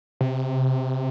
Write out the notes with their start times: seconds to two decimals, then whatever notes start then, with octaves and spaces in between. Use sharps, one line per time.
0.21 C3